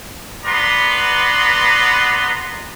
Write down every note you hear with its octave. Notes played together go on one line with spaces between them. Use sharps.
B3 B4 D5 A#5 C6